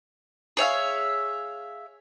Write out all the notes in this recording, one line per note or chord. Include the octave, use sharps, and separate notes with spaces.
G#4 C#5 E5 F5